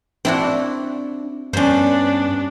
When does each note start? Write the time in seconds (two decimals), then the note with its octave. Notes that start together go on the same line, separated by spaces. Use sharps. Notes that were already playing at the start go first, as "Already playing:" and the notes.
0.25 C4 D4 E4 F#4
1.53 G2 B3 C#4 D4 C5